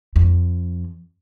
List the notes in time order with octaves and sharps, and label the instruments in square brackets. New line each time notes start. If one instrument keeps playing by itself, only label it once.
[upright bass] F2